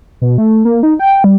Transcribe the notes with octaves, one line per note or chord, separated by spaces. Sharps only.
B2
A3
A#3
D#4
G5
G3